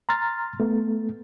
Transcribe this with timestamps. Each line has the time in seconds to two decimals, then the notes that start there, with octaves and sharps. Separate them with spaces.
0.09 A#5 C6 F6 A6
0.60 A3 B3